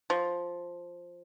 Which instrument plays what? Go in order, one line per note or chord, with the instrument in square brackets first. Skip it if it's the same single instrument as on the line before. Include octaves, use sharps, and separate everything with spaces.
[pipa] F3